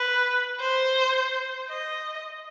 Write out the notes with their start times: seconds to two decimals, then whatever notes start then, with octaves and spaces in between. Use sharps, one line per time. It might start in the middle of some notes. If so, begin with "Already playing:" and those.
Already playing: B4
0.61 C5
1.69 D#5